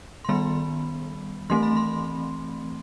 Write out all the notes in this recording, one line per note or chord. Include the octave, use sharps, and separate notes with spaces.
C6
D#3 G3 B3 B5
E3 A3 C4 C6
B5
C6